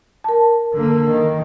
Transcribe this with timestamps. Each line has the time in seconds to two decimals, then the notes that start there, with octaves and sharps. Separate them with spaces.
0.24 A#4 A5
0.74 D3 A#3
1.11 D#3